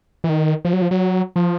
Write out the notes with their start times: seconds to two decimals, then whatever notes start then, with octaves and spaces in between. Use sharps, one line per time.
0.24 E3
0.29 D#3
0.65 F3
0.73 F#3
0.82 F3
0.91 F#3
1.36 F3